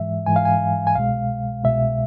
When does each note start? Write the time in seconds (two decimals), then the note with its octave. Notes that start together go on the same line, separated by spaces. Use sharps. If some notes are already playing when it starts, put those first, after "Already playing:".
Already playing: G#2 E3 G#3 E5
0.26 G#2 E3 G#3 G#5
0.36 F5
0.45 G#5
0.87 G#5
0.95 C2 B2 G#3 F5
1.64 C2 B2 G#3 E5